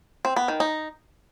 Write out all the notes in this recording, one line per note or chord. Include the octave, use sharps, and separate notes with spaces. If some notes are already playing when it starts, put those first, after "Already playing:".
C4
B3
D#3
D#4